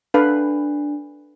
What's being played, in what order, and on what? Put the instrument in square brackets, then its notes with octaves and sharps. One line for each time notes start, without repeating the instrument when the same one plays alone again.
[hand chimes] D4 [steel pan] A4 B4 F5